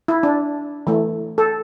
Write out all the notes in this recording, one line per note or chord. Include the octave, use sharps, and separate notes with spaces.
E4
D4
E3 A3
A4